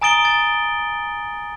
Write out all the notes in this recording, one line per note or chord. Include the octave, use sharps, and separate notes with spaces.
G#5 A#5 D#6 A6 D7 G7
A6